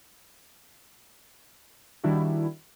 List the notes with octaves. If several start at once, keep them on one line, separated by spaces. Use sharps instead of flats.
D#3 G3 D4 E4 F#4